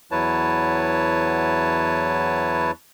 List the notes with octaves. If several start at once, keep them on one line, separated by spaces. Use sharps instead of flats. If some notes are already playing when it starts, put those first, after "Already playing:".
E2 F#3 E4 B4 C#5 A5